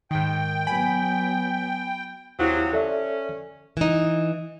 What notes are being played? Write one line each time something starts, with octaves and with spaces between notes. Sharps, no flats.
G#2 D#3 G5
F#3 B3 G#5 B5
D#2 C3 F3 F#3 E4 G4
C#4 A4 D5 E5
E3 D#4